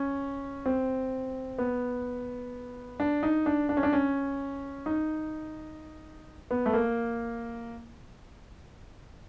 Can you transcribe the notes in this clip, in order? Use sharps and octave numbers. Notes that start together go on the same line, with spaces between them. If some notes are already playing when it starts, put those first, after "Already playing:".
Already playing: C#4
C4
B3
D4
D#4
D4
D4
C#4
D4
C#4
D#4
B3
A3
A#3